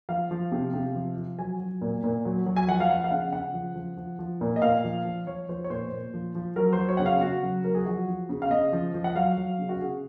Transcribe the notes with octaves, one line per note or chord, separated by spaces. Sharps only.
F3 F5
F3
C3
C3
F3
F3
F#3 G#5
F#3
A#2
A#2
F#3
F#3
G#5
F3 F#5
F5
F3 F#5
F5
C#3 F#5
C#3 F#5
F3
F3
F3
F3
A#2
D#5
A#2 F5
F3
F3
F3 C#5
F3 C5
C#5
A#2 C5
A#2
F3
F3
F#3 A#4
C5
F#3
C#5
C#3 F#5
F5
C#3 F#4
F#3
F#3 A#4
G#4
F3 F#4
F3
C#3
F5
C#3 D#5
F3
F3
F#5
F#3 F5
F#3
C#3
F#4
C#3 G#4